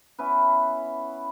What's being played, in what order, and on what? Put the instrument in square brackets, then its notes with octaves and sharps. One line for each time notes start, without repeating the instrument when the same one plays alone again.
[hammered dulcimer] B3 C#4 E4 B4